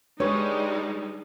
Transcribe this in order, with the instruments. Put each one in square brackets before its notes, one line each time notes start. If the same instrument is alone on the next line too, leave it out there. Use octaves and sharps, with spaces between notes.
[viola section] G3 G#3 D#4 [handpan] D4 [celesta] B4 C#6 [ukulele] C#5